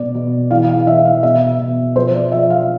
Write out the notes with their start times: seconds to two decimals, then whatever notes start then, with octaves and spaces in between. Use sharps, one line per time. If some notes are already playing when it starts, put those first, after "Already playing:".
Already playing: B2 D5
0.15 B2
0.51 E3 F5
0.69 F5
0.87 E3 E5
1.05 F5
1.23 B2 E5
1.60 B2
1.96 F3 C5
2.14 D5
2.32 F3 E5
2.50 F5